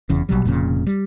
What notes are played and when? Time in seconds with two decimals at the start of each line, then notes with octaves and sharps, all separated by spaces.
0.09 F1 E2 C#3
0.29 A#1 B2 F#3 G3
0.45 F1 F2 A#2 C#3
0.87 G3